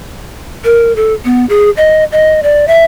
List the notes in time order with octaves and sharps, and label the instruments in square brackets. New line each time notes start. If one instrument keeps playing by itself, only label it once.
[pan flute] A#4
A4
B3
G#4
D#5
D#5
D5
E5